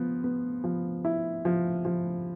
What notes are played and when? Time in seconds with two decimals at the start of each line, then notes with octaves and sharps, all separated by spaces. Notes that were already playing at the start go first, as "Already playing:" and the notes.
Already playing: F3 B3
0.24 B3
0.64 F3
1.05 E4
1.45 F3
1.85 F3